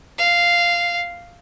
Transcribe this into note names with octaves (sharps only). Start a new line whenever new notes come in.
F5